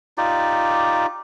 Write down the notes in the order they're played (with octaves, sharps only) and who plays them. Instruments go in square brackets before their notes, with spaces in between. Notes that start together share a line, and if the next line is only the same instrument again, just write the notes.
[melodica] D#4 F4 G4 D5